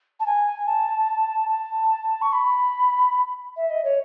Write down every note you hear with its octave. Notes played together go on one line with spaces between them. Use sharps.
A5
G#5
A5
A5
C#6
B5
E5
D#5
C#5